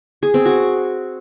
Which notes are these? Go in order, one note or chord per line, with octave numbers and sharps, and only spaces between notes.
G#4
C4
F#4